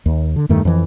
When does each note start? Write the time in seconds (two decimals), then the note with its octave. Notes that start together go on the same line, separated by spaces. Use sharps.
0.06 D#2
0.36 D3
0.49 E2 G2 D#3 A3
0.65 F2 E3